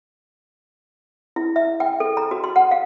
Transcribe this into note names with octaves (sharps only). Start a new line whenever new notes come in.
E4
E5
G5
A4
A#5
F#4
C6
F#5
F5